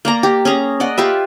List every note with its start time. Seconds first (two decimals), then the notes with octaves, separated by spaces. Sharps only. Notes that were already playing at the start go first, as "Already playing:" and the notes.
0.05 A#3 D5 A#5
0.23 G4
0.45 C#4 G#4 A#5
0.80 D5 D#5 F#5
0.98 F4 G4 B4 E5